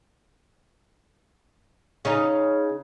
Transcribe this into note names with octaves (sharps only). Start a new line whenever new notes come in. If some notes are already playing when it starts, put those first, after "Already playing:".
C#3 D#4